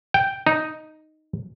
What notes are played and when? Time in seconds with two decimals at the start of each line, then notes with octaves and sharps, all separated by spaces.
0.14 G5
0.47 D#4